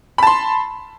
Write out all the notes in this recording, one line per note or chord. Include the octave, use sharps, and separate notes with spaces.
A5 B5 C6